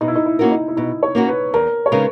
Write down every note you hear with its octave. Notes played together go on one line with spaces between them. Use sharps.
B2 D#4
E4
D#4
E4
A#3 C#4 F#4 A#4
D#4
E4
B2 D#4
C#5
A#3 C#4 F#4 A#4
B4
E2 A#4
C#5
C#3 G#3 D#4 A#4 B4